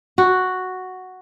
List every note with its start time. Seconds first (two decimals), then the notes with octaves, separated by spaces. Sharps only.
0.18 F#4